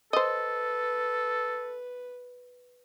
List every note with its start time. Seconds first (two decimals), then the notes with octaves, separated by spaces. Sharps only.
0.13 A4 B4 C5 D#5